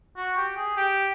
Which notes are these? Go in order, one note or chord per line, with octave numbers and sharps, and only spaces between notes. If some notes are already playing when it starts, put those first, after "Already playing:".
F#4
G4
G#4
G4